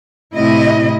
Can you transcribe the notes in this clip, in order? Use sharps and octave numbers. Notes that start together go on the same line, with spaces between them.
A2 C3 E4 D#5